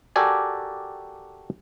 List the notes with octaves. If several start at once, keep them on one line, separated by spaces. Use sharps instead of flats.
F#4 G4 A4 A#4 D5 G#5